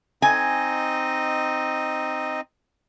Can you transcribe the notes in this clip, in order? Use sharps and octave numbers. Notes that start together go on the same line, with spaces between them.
C4 D#4 D#5 G#5